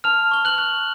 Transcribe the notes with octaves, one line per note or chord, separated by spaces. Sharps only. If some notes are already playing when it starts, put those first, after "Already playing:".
A5 F6 F7
C#6 G7
F#6 F#7
F#6